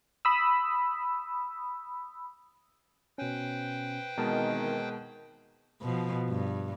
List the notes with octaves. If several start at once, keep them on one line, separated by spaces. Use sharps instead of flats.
B5 D#6 E6
B2 C#4 B4 C5 G5
B2 D#3 E3 G#3 C4 A#4 D#5 A5
B2 F3
G2